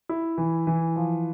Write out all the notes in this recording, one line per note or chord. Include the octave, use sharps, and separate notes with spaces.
E4
E3
E3
F3